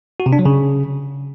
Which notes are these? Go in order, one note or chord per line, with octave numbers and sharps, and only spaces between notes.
F#4
C3
D4
F#3
C#3